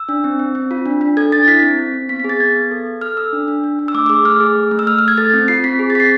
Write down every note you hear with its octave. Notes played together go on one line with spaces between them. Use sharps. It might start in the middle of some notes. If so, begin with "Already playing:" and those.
Already playing: E6
D4
C4
C4
C4
F4
D4
D4
A4 G#6
D4 A6
E4 B6
C4
C4
C4
B3 B6
G#4 B6
A6
B3 G#6
B3
A4
A4
A4 F6
A4 E6
D4
D4
D4
D4
E6
A3 D6
D6
G#4 E6
A3 F6
G#4
A3
A3
E6
A3 F6
A3 F6
G#6
A4 A6
C4
F4 C7
C4 B6
G#4
A6
C4 B6 C7